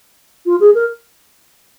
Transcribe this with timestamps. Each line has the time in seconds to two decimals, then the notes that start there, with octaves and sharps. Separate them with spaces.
0.45 F4
0.60 G#4
0.74 A#4